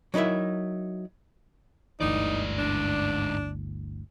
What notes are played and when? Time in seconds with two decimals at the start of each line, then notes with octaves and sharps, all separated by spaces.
0.14 F#3 D#4 E4 A#4 E5
2.00 G1 D2 G#2 E3 D#4 D5
2.59 D4